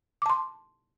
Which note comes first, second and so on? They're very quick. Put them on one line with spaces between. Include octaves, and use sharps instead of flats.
D6 A5 C6